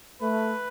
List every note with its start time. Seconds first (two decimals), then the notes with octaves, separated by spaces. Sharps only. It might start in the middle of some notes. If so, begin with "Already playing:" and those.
0.21 A3 B4